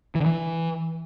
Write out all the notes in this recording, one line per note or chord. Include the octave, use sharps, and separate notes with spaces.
E3
D3
E3